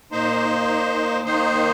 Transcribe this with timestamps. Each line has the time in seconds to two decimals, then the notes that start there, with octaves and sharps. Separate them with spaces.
0.12 A#2 A#3 D#4 C5
1.25 D#3 A#3 D#4 C5